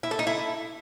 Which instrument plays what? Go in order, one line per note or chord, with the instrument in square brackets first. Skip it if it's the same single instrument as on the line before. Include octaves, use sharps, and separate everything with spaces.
[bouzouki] E4
A4
D#4
E4